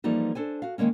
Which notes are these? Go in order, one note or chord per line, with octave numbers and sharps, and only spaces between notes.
E3 F3 G3 A#3 D#4 A4
D4 A4 C5 G#5
F#4 F5
D#3 F3 G#3 A#3 C#4